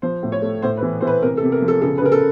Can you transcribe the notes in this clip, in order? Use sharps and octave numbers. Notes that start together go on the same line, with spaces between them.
F3 C5
A2
C#5
A3
A2 C5
B4
E3
E3 C5
B4
C3 A#4
A4
C3
A#4
F3
A4
C#3 A4
B4
C#3 A#4
A4